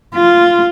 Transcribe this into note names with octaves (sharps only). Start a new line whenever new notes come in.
F4